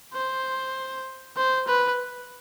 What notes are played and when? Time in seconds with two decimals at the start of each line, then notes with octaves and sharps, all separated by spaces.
0.14 C5
1.37 C5
1.68 B4